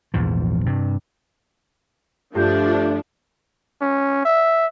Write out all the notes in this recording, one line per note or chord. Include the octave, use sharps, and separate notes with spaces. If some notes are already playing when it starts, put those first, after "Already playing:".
A#1 E2 G#2 F3
G2 C3
G2 F3 A3 D4 F4 G4 G6
C#4
E5